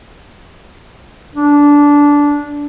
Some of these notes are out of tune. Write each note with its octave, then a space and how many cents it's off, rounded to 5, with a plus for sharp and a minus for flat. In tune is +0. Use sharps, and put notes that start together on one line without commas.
D4 -15